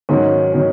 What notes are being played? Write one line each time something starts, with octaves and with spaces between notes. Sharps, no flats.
G#2 D#3 F#3 C#4
D#3 F#3 C#4